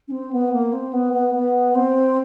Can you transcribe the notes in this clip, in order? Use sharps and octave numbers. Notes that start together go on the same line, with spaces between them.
C#4
C4
B3
A#3
C4
B3
B3
B3
C4